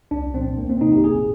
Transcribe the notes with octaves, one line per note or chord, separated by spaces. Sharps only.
C2 D4
A#2 F3 C4
D2 A#3
C4
C3 F3 D#4
G4
G1 G#4